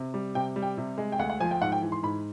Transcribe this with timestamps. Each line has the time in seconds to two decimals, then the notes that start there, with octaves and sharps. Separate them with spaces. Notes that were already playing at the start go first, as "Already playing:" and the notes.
Already playing: C3
0.14 G3
0.35 C3 G5
0.56 G3
0.62 G5
0.78 C3
0.98 G#3
1.12 G5
1.19 D2 F#5
1.30 F#5
1.40 F3 G#5
1.51 G5
1.62 G#2 F#5
1.72 G5
1.82 E3
1.92 C6
2.03 G#2 B5